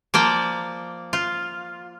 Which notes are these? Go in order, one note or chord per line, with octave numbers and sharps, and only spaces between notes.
F3 A#3 D5 G5
F4